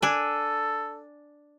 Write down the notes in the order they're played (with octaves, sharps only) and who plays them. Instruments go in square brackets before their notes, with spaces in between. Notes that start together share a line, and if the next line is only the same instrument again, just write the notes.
[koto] D4 G#5 [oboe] A4